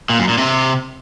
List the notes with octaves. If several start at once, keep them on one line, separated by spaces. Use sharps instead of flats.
A#2
F#2
A#2
C3